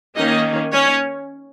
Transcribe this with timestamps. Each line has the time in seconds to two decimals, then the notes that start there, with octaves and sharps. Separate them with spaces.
0.16 D#3 A#3 C#4 D#4 D#5
0.72 C#4 C#5